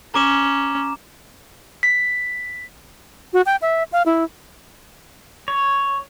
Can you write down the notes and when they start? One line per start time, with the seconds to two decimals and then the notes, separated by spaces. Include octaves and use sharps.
0.14 C#4 A#5 D6 E7
1.83 B6
3.33 F#4
3.46 G5
3.62 E5
3.92 F5
4.06 E4
5.48 C#5